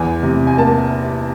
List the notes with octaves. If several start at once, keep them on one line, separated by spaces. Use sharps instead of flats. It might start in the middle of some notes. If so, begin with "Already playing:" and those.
Already playing: E2 G#5
C3
G#5
A#3 A5